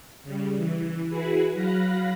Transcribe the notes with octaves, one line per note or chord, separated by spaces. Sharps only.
C#3 G3
E3
E4 F#4 G#4 B4
F#3 F5 B5 F#6 A#6